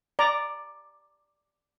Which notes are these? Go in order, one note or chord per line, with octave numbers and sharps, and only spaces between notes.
D5 A#5